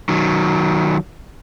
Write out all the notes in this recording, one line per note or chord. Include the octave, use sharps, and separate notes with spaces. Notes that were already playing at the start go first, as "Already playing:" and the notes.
D#3 F#3